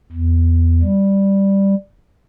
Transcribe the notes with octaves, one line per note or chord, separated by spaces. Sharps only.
E2
G3